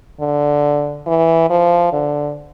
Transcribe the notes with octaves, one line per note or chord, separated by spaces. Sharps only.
D3
E3
F3
D3